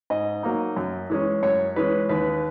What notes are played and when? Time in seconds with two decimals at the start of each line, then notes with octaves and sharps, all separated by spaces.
0.10 G#2 D#5
0.43 F#3 A#3 D#4
0.77 F#2
1.10 E3 G#3 C#4
1.43 F#2 C#5
1.76 E3 G#3 C#4 B4
2.09 D#2 B4